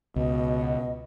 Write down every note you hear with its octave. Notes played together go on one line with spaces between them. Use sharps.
C#2 B2 D#5